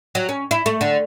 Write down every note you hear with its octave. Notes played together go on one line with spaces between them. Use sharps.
F#3
C#4
E4
A3
D3